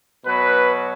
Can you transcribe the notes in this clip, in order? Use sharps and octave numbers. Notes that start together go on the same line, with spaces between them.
B2 F#3 B4